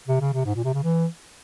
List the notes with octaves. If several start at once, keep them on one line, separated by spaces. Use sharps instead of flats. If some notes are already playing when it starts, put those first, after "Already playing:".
C3
C#3
C3
G#2
A#2
C3
C#3
E3